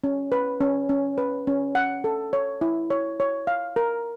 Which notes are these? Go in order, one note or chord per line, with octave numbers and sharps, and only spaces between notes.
C#4
B4
C#4
C#4
B4
C#4
F#5
A4
C#5
E4
C#5
C#5
F5
A#4